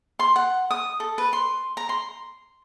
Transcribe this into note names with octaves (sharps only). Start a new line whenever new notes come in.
C6
F#5
D#6
A4
B4
C6
A#5
C6